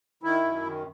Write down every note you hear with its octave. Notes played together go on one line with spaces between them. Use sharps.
D#3 E4
F#2
D#3